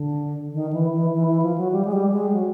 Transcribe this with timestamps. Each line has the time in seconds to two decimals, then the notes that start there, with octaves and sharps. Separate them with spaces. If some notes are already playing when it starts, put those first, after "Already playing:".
Already playing: D3
0.53 D#3
0.73 E3
0.92 E3
1.13 E3
1.28 E3
1.42 F3
1.58 F#3
1.72 G3
1.85 G#3
1.93 G3
2.12 G#3
2.32 F#3